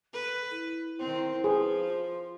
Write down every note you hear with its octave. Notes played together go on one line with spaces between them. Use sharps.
A4 B4
E4
D#3 C4 C5
F3 G#4 B4
F4